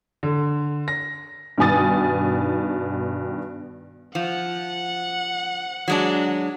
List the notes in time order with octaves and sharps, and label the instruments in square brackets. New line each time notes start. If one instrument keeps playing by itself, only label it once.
[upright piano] D3
A#6
[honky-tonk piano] G2 B2 D#3 G#5 D#6 A6
[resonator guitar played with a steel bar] F3 [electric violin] F#5
[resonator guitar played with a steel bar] F#3 G#3 D4